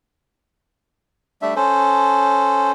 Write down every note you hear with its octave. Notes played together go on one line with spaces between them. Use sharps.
G3 A3 D4 E5
C#4 A4 C5